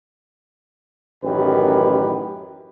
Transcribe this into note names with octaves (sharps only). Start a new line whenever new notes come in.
A1 F#2 D#3 G4 B4